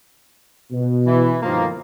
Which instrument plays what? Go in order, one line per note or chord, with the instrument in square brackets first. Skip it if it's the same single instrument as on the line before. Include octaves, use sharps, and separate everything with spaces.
[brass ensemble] B2
[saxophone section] E3
[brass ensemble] G1 [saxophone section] D#3 F3 A#3